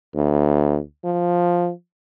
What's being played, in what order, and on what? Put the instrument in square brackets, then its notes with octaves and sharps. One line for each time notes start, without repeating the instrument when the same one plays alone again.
[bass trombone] D2
F3